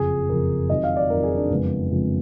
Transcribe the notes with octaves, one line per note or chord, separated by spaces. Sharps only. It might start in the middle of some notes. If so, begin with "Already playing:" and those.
Already playing: F#1 F2 F3 G#4
F#1 F2 F3 A#4
F2 D#3 F#3 D#5
F5
D5
F2 D#3 F#3 A#4
G#4
D4
F#1 F2 F3 G#3 B3
F#1 F2 F3 G#3